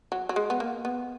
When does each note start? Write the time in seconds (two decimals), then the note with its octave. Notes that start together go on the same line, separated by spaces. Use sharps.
0.12 F#3
0.29 F#3
0.36 G#3
0.50 B3
0.60 A#3
0.85 B3